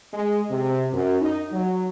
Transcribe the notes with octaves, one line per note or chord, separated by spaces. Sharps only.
G#3
C3
F#2
D#4
F#3